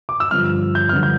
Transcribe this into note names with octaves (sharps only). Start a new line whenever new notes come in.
D6
E6
G2 D3 F3 F6
G6
G2 D3 F3 F6
G6